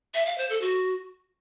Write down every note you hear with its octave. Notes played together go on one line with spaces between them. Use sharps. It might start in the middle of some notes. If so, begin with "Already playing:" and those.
E5
F5
C5
A4
F#4